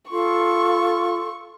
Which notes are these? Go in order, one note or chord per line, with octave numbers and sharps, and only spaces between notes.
F4 A4 C6 C#6